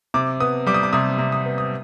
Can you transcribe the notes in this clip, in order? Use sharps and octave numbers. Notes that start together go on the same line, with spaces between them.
C3 D6
B3 D#6
G3 D6
D#6
D6
C3 D#6
C3
D#6
B3
D#6